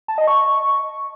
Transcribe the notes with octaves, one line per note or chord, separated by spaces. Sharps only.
A5
D#5
C#6